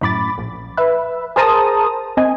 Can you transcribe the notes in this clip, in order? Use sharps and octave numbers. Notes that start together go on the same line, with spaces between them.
F#2 A2 B5 D6 A6
A#1
B4 E5
G#4 A#4 C5 A5 A#5 D#6
C4 D#5 G#5